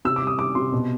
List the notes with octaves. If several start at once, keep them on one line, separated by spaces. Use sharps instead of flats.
C3 E6
D6
G3
D#6
G3 D6
C3 C6
B2